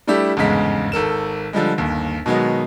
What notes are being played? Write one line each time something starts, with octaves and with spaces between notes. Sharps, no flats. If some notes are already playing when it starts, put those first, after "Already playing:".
G3 A3 D4 E4 G4
G1 E2 G#2 C#3 G#3 B6
G#1 A4 A#4 E7
D3 F3 G3 G#3
G1 D#2
B2 D#3 F#3 G#3 B3